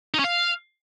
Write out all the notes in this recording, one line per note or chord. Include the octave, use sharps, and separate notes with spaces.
D#4
C#4
F5